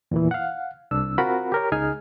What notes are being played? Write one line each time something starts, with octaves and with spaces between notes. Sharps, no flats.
E2 A#2 E3
F5 F#5
C2 D4 E6
C4 F4 F#4 A#4 F#5 B5
G4 A#4 C#5
C#2 D#4 G#4 G#5 F6